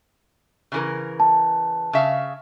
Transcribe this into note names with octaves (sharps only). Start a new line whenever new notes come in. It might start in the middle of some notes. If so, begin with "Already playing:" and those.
C#3 E3 A#4
A5
C#3 E5 F5